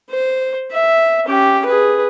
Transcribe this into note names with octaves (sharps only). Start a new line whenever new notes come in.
C5
E5
C#4 G4
G#4 B4